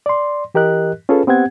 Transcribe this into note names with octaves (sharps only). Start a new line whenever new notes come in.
D5 C6
E3 G4 A#4 D#5 F#6
C#4 F4 G#4 A4 B4
B3 C4 G4 F#5 G#6